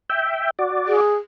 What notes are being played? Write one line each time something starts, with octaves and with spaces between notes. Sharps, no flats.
E5 G5
F#4 D5
G#4